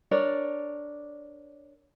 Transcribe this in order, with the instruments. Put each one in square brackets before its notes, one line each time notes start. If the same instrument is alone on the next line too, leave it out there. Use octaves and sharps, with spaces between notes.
[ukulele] D4 A#4 C#5 D5